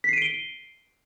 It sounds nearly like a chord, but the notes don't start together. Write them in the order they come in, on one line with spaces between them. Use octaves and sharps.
B6 C7 D#7 D7 G7